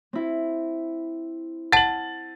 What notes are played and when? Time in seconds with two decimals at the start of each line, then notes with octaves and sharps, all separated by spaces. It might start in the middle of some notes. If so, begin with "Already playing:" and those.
0.13 C4 E4
1.72 F#5 A5 A6 F#7